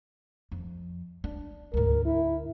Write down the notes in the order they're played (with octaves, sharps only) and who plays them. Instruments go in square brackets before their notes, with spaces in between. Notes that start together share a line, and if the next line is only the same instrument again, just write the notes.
[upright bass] F2
D4
[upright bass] D2 G#2 [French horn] A#4
[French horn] E4